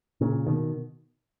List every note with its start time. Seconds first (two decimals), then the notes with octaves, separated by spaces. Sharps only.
0.21 A#2 C#3
0.47 B2 D#3